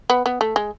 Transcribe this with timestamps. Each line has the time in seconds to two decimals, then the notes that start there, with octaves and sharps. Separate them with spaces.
0.10 B3
0.26 B3
0.41 A3
0.56 G#3